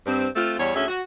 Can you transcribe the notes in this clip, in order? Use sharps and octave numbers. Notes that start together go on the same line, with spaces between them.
G2 C4
A3 C4 F4
E2 G3 C#5
D2 C#4 G#4 E5
F#4